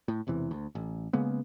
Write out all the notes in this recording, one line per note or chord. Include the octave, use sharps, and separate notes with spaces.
A2
E1 E2 C3 E3
D2
A1
C#3 G#3 A#3 B3